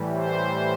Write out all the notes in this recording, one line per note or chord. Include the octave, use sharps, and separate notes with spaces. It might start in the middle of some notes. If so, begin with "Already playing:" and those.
Already playing: A2 E3 G3
C5